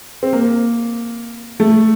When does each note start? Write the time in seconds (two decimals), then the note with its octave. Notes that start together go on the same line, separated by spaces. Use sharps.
0.23 C4
0.33 A#3
1.60 A3